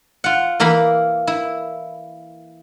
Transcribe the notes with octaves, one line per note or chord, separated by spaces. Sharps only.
F4 F#5
E3 A#3 A#4 B5
E4